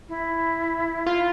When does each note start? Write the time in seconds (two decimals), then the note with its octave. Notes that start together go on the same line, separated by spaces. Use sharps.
0.09 E4
1.06 F4